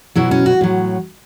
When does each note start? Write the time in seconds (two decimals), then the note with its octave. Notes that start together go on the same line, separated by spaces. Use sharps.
0.16 B2 F#3 E4
0.31 C#4
0.46 F#4
0.61 A2 F#3